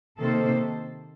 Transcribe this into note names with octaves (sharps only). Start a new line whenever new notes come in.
C3 D#3 A#3 A4 C5